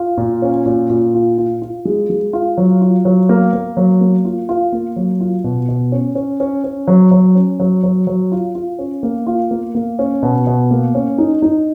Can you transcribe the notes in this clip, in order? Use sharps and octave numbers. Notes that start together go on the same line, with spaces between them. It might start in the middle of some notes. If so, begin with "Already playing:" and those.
Already playing: F4
A#2
C#4
A#2
A#2
F4
F4
F4
G#3
G#3
F4
F#3
F4
F#3
A#3
A#3
F#3
A#3
F4
F4
A#3
F#3
F4
B2
B2
C#4
C#4
C#4
C#4
F#3
F#3
C#4
F#3
F#3
F#3
F4
F4
C#4
A#3
F4
A#3
A#3
C#4
B2
B2
A#3
C#4
D#4
D#4